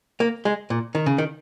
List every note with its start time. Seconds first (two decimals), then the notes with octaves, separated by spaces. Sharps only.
0.20 A#3
0.45 G#3
0.70 A#2
0.95 D#3
1.06 C#3
1.18 D#3